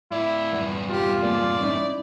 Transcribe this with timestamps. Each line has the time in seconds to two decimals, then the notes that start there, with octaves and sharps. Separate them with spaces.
0.12 A2 E4 D5
0.53 E2 G2 B3
0.89 F4 G4
1.22 G#3 A#3 D5
1.60 C#4 D#4 E4